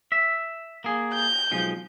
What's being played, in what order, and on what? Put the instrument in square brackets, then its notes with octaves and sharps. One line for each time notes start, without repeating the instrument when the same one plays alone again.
[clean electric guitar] E5
A#3 G#4
[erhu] G6
[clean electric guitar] B1 F3 G#3